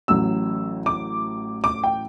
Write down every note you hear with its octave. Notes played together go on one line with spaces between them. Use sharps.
A1 A2 F#3 E6
D6
D6
G5